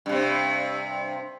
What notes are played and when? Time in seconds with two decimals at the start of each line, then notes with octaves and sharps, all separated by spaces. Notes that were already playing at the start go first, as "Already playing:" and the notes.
0.06 G2 C3